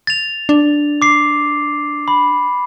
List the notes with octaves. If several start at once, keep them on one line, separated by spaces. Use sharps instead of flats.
A6 F7
D4
D6 C7
B5